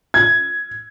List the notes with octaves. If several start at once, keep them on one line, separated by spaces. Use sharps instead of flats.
G#6